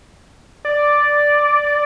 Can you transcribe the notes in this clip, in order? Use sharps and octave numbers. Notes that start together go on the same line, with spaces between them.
D5